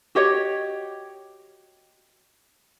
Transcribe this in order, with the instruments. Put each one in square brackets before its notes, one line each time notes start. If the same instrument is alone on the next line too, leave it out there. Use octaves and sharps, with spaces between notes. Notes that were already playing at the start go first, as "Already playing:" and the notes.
[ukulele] F#4 G4 C#5 D#5